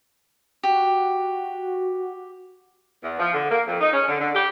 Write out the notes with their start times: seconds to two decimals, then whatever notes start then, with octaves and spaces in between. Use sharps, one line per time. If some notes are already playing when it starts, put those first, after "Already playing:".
0.63 F#4 G4
3.03 E2
3.20 F3
3.33 D3
3.50 A#3
3.67 F2
3.81 D#4
3.93 C#4
4.08 D3
4.20 D3
4.35 G4